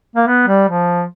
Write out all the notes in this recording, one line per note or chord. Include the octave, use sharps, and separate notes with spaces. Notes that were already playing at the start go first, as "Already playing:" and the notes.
A#3
B3
G3
F3